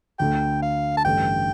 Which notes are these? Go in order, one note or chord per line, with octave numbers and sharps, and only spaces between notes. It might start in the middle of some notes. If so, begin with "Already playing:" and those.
D2 D3 A3 G5
F5
A5
A1 G2 D3 A3 G5